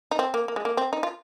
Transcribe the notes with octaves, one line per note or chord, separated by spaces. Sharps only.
D#4
C4
A#3
A#3
G#3
A#3
C4
D#4
F4